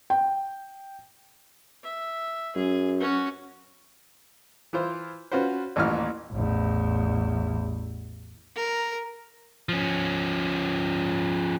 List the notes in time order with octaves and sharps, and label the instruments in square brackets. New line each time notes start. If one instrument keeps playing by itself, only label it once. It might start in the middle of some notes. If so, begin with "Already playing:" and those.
[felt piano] G5
[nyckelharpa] E5
[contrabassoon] F#2 [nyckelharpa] G#4
[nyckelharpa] C#4 F#4
[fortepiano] E3 E4 F4 C5
C#4 F4 F#4 B4 C5
A1 D#2 A#2 E3 F6
[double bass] A1 E2
[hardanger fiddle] A#4
[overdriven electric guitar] F3 C#4